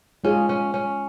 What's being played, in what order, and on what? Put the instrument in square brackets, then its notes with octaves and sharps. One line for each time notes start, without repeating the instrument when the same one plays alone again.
[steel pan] G#3 F4 G#4 [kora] C#4
[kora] C#4
C#4